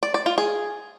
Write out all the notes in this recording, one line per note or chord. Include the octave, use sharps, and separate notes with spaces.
D5
D5
F4
G#4